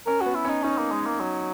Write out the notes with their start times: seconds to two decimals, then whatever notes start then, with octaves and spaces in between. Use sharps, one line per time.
0.07 C#4 A#4
0.21 B3 F#4
0.35 E4
0.45 C#4 D#4
0.64 C#4 D#4
0.78 A#3
0.92 G#3
1.06 A#3
1.20 F#3